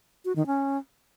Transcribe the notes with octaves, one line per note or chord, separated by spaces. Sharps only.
F#4
D#3
C#4